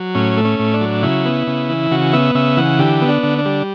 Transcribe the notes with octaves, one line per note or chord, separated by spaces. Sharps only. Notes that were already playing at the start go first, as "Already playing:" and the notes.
Already playing: F#3
A2 C#4
A3
C#4
A2
D4
F#3
C#3 E4
B3
C#3
E3
C#3 F#4
B3 E5
C#3 E5
E3 F#5
D3 G4
B3
D4
D3
D4
G3